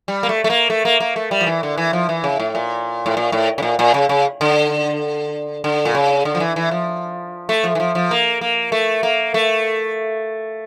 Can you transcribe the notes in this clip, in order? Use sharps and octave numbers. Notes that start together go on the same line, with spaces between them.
G3
A#3
A3
A3
A#3
A3
A#3
A#3
A3
G3
F3
E3
D3
E3
F3
E3
C#3
A2
A#2
A2
A#2
A2
C#3
A#2
A#2
C#3
C#3
D3
D3
A#2
C#3
D3
F3
E3
E3
F3
A3
F3
E3
F3
F3
A#3
A#3
A3
A#3
A3